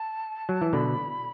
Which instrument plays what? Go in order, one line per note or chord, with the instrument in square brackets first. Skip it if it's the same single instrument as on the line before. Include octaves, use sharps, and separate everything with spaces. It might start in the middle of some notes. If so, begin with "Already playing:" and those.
Already playing: [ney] A5
[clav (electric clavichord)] F#3
E3
[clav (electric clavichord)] B2 D3 [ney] B5